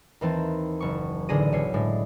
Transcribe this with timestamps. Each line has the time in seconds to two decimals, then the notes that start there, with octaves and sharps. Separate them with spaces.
0.21 D#2 E3 C4 A5
0.80 F#1 C#6
1.29 A1 D3 D4 G#4 A#6 D#7
1.52 B1 C#5 C7
1.74 A2 G#3 D4